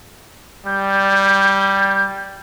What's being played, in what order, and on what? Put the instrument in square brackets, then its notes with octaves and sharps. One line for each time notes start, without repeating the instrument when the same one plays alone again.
[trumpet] G3 [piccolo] G6